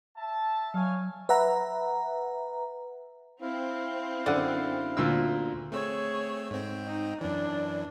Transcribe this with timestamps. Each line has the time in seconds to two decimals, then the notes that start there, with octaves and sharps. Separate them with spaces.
0.17 E5 A5
0.74 F#3 C#5 F5 G#5
1.29 B4 E5 F#5 A#5
3.42 C4 E4 F5
4.26 F#2 D3 D5 F#5
4.97 D2 A#2 E6
5.72 A3 C4 G#4 C#5 E6
6.51 G#2 C4 G5
6.86 D#4
7.21 F#2 E3 D4